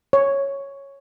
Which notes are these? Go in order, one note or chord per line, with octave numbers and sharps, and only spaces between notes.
C#5